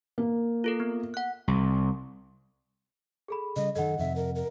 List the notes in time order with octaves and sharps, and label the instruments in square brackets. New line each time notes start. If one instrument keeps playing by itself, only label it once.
[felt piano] A#3
[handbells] F4 A4 A#4
B3
F#5 F#6
[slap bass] C2
[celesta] G#4 A4 B5
[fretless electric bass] C#3 G3 [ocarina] D#5
[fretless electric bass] F#2 D#3 [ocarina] A4 [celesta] D#5 F#5
[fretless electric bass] F2 C3 [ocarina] E5
[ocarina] A#4
A#4